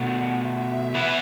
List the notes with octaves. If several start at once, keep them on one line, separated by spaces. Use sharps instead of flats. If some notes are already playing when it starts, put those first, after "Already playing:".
Already playing: B2 A3 D4 F#4 F#5
E5
E3 B3 E4 B4